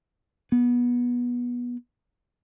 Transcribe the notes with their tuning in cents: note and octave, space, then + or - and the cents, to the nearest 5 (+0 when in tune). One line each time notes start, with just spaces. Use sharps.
B3 -20